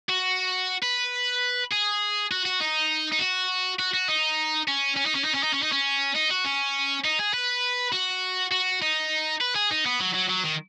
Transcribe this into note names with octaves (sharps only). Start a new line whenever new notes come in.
F#4
B4
G#4
F#4
F#4
D#4
D#4
F#4
F#4
F#4
D#4
C#4
C#4
D#4
C#4
D#4
C#4
D#4
C#4
D#4
C#4
D#4
F#4
C#4
D#4
G#4
B4
F#4
F#4
D#4
B4
G#4
D#4
B3
F#3
F#3
F#3
D#3